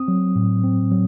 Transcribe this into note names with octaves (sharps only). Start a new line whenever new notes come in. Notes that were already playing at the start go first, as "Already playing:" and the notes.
Already playing: C4 D#6
F#3
A2
C4
F#3